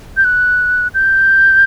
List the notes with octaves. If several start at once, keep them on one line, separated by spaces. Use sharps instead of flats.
G6
F#6
G6